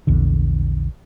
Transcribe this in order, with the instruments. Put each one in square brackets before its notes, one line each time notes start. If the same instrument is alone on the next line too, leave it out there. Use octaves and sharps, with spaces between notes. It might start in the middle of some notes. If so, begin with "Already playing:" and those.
[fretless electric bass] A#1 E2 D3